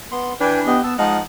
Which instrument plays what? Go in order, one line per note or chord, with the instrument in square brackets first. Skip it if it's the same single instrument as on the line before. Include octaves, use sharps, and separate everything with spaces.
[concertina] B3 C6
[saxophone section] E3 D4 [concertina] B4 G5 G#5
[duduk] B3 [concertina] G4 D#5
[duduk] B3 [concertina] A5 E6
[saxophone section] F3 D#4 F#5 [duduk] G#3 [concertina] F5